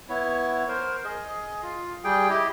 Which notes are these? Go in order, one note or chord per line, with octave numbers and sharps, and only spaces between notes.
B3 E4 C#5
A#4 C5
G#4 D#5
F4
G3 G#4 G5
E4 G4 D#5